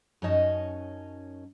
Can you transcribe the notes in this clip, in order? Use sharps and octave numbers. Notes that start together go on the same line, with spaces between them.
F#2 C#4 D#4 C#5 D#5 A5